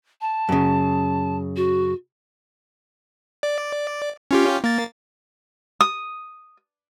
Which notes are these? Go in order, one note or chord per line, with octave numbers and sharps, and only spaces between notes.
A5
F#2 C#3
F#4
D5
C#4 F4 G4
A#3 A6
D#6